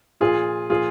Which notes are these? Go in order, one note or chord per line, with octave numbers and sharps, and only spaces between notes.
A#2 F3 F4 G#4
A#2 F3 F4 G#4